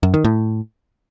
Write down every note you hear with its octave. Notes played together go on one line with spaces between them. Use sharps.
F#2
D#3
A2